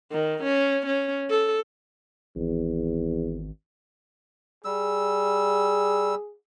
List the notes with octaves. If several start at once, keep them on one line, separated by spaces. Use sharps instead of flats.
D#3
C#4
C#4
A4
G#1 E2
G3 G#4 E6